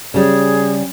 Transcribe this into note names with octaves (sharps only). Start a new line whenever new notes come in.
C#3 G3 G#4